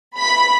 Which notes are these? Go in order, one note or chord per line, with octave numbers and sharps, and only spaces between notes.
B5